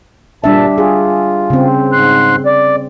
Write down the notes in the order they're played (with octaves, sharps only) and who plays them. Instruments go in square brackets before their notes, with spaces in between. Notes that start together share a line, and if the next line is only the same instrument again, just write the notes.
[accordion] A#2 A5 [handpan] G3 D4 E5
[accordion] F4 [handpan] G#4
[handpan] C#3 C4
[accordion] G#2 C6 F#6
D5